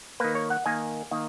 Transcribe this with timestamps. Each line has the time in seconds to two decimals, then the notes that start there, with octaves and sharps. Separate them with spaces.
0.20 D#3 A#3 B4
0.35 C#5
0.50 F#5
0.66 D#3 A#3 G#5
1.11 D#3 A#3